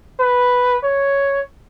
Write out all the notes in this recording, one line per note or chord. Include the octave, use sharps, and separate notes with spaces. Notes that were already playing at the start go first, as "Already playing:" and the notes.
B4
C#5